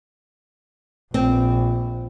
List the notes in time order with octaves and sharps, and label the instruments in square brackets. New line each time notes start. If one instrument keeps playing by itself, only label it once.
[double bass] A#1 [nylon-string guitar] C4